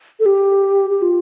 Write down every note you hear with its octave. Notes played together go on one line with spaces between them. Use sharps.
A4
G4
G4
F4